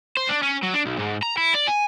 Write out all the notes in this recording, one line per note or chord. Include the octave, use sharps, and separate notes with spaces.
C5
D4
C#4
F#3
D4
B1
G#2
A#5
E4
D5
G#5